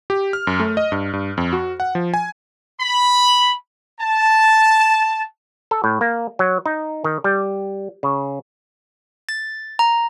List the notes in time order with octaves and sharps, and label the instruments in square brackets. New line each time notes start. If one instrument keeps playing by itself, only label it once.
[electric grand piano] G4
F6
F#2
A3
D#5
G2
G2
F2
F#4
F#5
F3
G#5
[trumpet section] B5
A5
[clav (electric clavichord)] A4
A2
A#3
F#3
D#4
D#3
G3
C#3
[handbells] A6
A#5